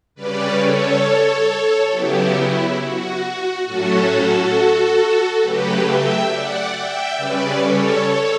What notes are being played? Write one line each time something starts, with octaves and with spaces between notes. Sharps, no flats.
C#3 G3 C#4 B4 D5
A4 C#5
C#3 F#3 B3 E4 G4
E4
F#4
A2 F#3 A3 C#4 F#4 A4
F#4 A4
C#3 F#3 A3 G4 B4
E5 G5
D5 F#5
E5 G5
C#3 G3 C#4 B4 D5
A4 C#5